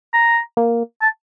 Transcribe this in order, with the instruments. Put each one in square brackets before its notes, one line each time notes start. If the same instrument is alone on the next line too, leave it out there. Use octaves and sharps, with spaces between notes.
[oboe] A#5
[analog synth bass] A#3
[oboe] A5